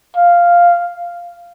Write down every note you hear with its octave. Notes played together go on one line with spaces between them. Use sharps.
F5